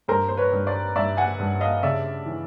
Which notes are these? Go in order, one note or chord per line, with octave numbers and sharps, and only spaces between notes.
G2 A#4 C5
C5
B4 C#5
G2
C5 D5
G2 D5 E5
F#5 G#5
G2
D#5 F5
C#3 D5 E5
E3